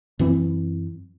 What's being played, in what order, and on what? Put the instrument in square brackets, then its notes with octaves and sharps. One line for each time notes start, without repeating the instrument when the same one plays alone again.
[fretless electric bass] F#2 E3 C4